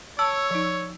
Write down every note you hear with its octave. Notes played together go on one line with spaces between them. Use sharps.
C#5 A5 E6
F3 D#4